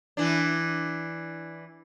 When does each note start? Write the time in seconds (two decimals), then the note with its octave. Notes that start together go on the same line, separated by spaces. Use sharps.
0.17 E3 D4